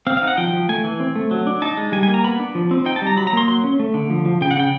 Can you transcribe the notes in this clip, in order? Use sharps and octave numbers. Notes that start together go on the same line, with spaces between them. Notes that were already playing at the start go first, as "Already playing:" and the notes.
C4 F5
F5
D#4
F#5
F3 G5
F3
A3 G#5
E3
C4
A3
F#3
D4
D#4 A5
G#3
G3 G#5
G#5
A#3
A#5
B3 B5
D4
F3
C4
D#4 G5
A5
G3
A#5
F#3 B5
A#5
A#3 C6
F#3 C6
C#4
A3
D3
F3
F3
C#3 G5
F#5
C#3 G5